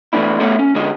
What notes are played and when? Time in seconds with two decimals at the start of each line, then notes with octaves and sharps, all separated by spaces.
0.13 E3 A3 B3 D4 E4
0.40 A3 B3 A4 C#5 E5 F#5
0.59 C#4
0.75 D3 G#3 B3 D4 G#4 D#5